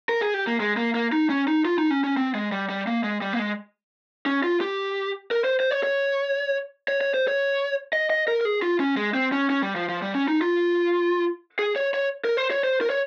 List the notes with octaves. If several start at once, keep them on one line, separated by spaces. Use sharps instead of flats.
A#4
G#4
G4
A#3
G#3
A#3
A#3
D#4
C#4
D#4
F4
D#4
C#4
C#4
C4
G#3
G3
G3
A#3
G#3
G3
A#3
G#3
C#4
F4
G4
A#4
C5
C5
C#5
C#5
C#5
C#5
C5
C#5
D#5
D#5
A#4
A#4
G#4
F4
C#4
G#3
C4
C#4
C#4
G3
F3
F3
G3
C#4
D#4
F4
G#4
C#5
C#5
A#4
C5
C#5
C5
A#4
C#5